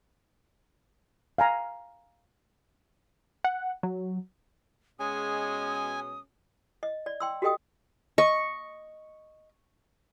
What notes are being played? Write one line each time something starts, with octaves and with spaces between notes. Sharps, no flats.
F5 G#5 A#5
F#5
F#3
B2 G#3 C#4 G#5 D#6
D#5
D5
G5 C6 E6
F#4 G4 A4 D#5 G5 D#6
D#5 C#6